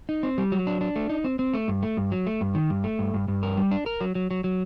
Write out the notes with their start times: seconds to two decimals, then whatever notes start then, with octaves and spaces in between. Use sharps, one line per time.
0.09 D#4
0.23 C4
0.38 G3
0.52 F#3
0.67 D4
0.81 D4
0.96 A3
1.09 D#4
1.24 C4
1.39 C4
1.54 A3
1.68 G2
1.82 A3
1.97 G2
2.12 F#3
2.27 A3
2.41 G2
2.55 D#3
2.70 G2
2.84 A3
2.99 G2
3.14 G2
3.28 G2
3.43 A#4
3.57 G3
3.71 D4
3.86 A#4
4.01 F#3
4.15 F#3
4.31 F#3
4.44 F#3